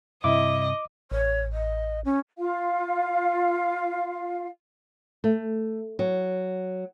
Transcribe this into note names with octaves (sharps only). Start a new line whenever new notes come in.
G2 C3 E4 D#5 D6
A1 C#5
D#5
C#4
F4 F5
A3
F#3